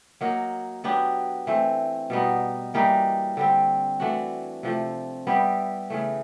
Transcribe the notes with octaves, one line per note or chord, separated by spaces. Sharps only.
F#3 A#3 D#4 F#4
F#3 B3 D4 G4
E3 A3 C4
B2 G3 B3 D#4
E3 G3 A#3 D#4
D3 G3 C4
E3 A3 D4 F#4
C3 F3 A3
G3 B3 E4 G4
C#3 E3 A3